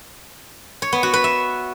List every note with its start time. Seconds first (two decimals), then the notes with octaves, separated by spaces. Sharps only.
0.82 C#5
0.93 B3
1.03 F#4
1.13 B4
1.24 E5